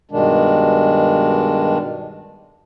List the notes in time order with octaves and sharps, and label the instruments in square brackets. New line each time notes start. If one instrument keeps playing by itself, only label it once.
[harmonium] G2 B2 D#3 G#3 D4